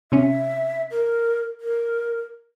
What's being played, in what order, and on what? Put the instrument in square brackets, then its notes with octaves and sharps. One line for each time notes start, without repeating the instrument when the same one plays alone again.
[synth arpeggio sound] C3 C#4 [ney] E5
[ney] A#4
A#4